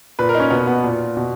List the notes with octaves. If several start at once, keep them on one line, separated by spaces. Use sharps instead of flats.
A#2 B4
A#4
D#4
C#4
B2 B3
B3
A#2
B2